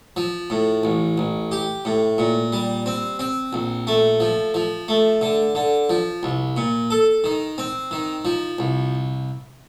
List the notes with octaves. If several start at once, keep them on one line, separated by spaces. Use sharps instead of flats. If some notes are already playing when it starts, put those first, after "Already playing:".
F3
A2
A1
A1
G4
A2
A#2
G3
C4
C4
A#1
A3
F3
F3
A3
D3
D3
F3
C2
A#2
A4
D#3
C4
D#3
F3
C2